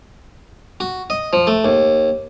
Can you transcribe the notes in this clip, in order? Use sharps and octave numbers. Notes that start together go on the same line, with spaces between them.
F#4
D#5
F3
A3
D#2